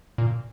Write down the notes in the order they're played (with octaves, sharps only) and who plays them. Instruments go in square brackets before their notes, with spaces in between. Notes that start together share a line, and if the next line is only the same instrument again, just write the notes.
[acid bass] A#2